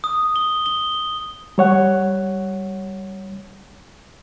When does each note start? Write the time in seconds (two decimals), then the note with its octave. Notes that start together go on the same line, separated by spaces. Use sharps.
0.04 D#6
0.36 G7
0.66 G7
1.58 G3 C#5 F#5